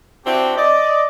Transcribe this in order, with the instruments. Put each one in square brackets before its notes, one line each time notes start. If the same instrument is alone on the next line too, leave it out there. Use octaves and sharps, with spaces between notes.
[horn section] C4 D4 E4 F#4 G4
D5 D#5